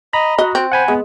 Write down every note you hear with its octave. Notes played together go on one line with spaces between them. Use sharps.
D#5 A#5 B5
F#4 D#5
C4
C5 F#5 G#5 B5
G#3 B3